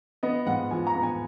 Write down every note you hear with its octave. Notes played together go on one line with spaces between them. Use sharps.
B3 D#5
G#2 F#5
F3 G#5
A#5
B3
G#5